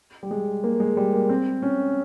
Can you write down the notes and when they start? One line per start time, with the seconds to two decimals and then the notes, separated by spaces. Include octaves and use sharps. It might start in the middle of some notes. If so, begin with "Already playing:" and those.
0.23 G3
0.31 G#3
0.64 A#3
0.80 G#3
0.97 G3
1.14 A#3
1.29 C4
1.62 C#4